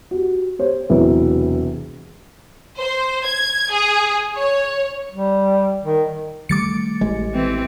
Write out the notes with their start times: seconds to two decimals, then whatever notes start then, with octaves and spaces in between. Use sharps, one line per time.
0.11 F#4 G4
0.59 G4 C5 C#5
0.90 E1 C3 F#3 E4 B4
2.79 C5
3.26 G#6
3.72 G#4
4.37 C#5
5.11 G3
5.83 D#3
6.49 D#3 G3 A3 D6 A6 C#7
7.01 A1 G#3
7.33 E3 C4